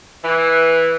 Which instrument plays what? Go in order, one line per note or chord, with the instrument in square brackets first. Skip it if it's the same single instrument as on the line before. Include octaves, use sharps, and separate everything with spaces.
[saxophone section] E3